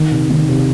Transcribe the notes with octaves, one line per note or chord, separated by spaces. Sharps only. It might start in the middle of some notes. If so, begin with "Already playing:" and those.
Already playing: D#3
C3
D#3
C3